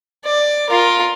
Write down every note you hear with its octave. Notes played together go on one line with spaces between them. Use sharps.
D5
F4 A#4